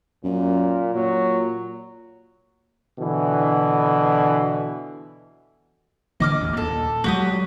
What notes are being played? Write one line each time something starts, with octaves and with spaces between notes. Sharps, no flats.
F#2 A#2
A#2 F#3
B2 D3 E3
D3 E3 A#3 D#5 D6 F6
A1 D#2
D#2 A#2 A4
F#3 G#3 A3 F#4 G4 D#6